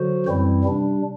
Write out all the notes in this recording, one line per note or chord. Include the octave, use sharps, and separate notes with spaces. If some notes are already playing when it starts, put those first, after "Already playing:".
Already playing: D3 F#3 F#4 C5
F#2 E3 G3 C4 E4
C3 G3 D4